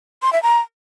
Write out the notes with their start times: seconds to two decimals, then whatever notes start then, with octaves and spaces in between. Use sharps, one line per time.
0.22 C6
0.33 E5
0.43 A#5